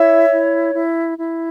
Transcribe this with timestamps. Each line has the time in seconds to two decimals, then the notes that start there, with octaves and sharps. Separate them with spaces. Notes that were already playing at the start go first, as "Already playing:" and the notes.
Already playing: E4 C#5 E5
0.30 E4
0.73 E4
1.18 E4